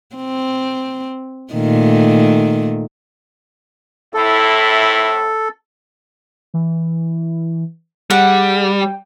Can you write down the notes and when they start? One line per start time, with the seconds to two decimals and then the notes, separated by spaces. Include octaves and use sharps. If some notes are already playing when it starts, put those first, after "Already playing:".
0.16 C4
1.53 A#2 D#3 A3
4.14 F2 A2 E4 A4
6.54 E3
8.10 G3 G#4 F#5
8.81 G5